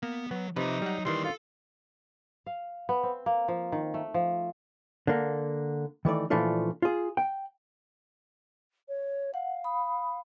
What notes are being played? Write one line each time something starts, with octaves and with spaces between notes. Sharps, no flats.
A#3 B3
F#3 B3
C3 F3 D#4 B4 E5
F#3 G3 F#5
D#2 D#3 E3 G3 D5 C6
F4 A4
F5
B3
C4
A#3
F3
D#3
A3
F3
D3 A#3
D#3 E3 A3 D5
A#2 E3 F3 A3 D4 F4
F4 G#4
G5
C#5
F5 F#5
B5 D#6